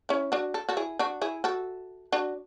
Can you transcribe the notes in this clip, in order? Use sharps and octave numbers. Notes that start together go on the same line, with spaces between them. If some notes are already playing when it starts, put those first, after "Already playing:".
C#4 E4
D4 F#4
A4
F#4 A4
E4 G#4
D4 F#4
E4 G#4
F#4 A4
D4 F#4